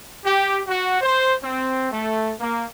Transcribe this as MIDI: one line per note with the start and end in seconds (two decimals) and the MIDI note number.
0.23 0.58 67
0.67 0.95 66
1.00 1.33 72
1.42 1.89 60
1.90 2.31 57
2.39 2.64 58